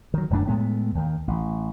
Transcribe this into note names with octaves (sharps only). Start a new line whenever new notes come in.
D#3 F#3
F1 F#2 A3 D4
A2 G#3 A3 B3
D#2 D#3
A1